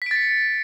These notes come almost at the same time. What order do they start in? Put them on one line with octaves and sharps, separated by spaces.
B6 D7 A6 C#7